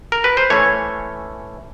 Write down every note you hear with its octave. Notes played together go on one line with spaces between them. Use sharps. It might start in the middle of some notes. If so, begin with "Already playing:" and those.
A#4
B4
C5
E3 A3 C#4 C#5